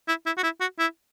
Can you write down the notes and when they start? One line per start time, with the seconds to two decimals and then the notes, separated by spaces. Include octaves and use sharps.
0.08 E4
0.26 E4
0.37 F#4
0.43 E4
0.61 F#4
0.79 E4